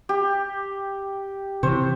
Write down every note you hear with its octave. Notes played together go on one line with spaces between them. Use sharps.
G4
C3 E3 C5 C#5